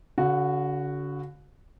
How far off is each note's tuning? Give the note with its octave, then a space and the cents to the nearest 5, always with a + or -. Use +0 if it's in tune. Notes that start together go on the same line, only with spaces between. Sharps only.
D3 -45 F#4 +0